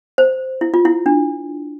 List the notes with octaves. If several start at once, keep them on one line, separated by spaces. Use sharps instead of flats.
C5
E4
F4
E4
D4